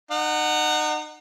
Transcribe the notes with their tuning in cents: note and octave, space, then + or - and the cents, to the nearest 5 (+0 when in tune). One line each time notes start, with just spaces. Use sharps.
D#4 -35 F#5 +0